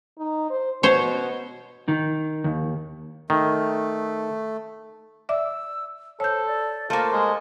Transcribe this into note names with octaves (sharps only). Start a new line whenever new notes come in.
D#4
C5
B2 C5 C#5
D#3
D#2
D#3 A3
D5 E5 D6 E6
A4 C5 C#5 G6
D5
A3 A#3 F4 C5
G#3